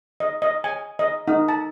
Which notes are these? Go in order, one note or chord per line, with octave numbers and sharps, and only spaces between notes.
D#5
D#5
G#5
D#5
D#4
A5